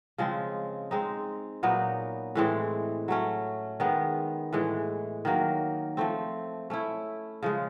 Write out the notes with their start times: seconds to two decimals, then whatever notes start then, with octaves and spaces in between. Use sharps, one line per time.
0.18 C#3 F3 G#3 C4
0.91 G#3 C4 D#4
1.63 A#2 F#3 B3 D#4
2.35 A2 E3 G#3 C4
3.08 F#3 A3 C#4
3.80 D#3 G#3 B3
4.53 A2 E3 G#3
5.25 D#3 F#3 A#3
5.97 F3 A3 C4
6.70 A3 C#4 E4
7.43 C#3 F3 G#3